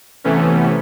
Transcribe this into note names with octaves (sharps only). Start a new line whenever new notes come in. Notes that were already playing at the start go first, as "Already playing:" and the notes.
C3 E3 A3 B3 C#4